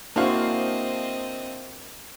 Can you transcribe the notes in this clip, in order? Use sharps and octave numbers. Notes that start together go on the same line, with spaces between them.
A#3 C4 D4 E4 F#4 C5 D#5 F5